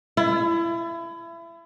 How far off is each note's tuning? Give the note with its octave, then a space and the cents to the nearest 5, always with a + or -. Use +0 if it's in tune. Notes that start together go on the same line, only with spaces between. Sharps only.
E4 +30